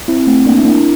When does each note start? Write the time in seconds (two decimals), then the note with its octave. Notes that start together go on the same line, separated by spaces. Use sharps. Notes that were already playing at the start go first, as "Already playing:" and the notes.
0.08 C4 E4
0.27 A3 C4
0.46 A#3 D4
0.58 E4
0.65 A#3 D4